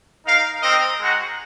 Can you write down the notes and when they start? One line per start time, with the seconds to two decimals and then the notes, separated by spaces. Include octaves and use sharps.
0.24 D#4 A#4 F5
0.62 C4 D#4 A#4 D#5
1.00 G#3 D#4 F#4